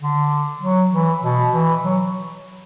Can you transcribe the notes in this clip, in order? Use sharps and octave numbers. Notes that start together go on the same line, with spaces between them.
D3
F#3
E3
B2
E3
F#3